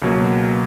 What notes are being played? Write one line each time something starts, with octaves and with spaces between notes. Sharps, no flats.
C#2 B2 F#3 A#3